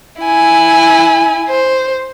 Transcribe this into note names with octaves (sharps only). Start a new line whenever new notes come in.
E4 G#5
C5